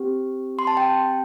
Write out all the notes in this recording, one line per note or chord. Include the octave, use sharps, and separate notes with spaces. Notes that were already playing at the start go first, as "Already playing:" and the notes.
Already playing: C4 G4
C6
A5
G5